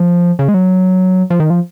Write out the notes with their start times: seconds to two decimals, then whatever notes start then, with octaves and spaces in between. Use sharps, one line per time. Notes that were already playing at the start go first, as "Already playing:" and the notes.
Already playing: F3
0.39 C#3
0.48 G#3
0.54 F#3
1.30 F3
1.40 D#3
1.50 F3